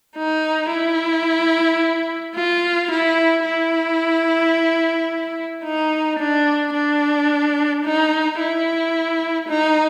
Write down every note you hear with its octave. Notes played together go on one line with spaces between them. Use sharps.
D#4
E4
F4
E4
E4
D#4
D4
D4
D#4
E4
D#4